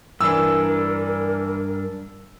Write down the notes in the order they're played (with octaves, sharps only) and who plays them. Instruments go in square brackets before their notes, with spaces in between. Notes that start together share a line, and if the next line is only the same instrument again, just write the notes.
[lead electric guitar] G2 D4 [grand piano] E3 [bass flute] A#4 [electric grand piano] E6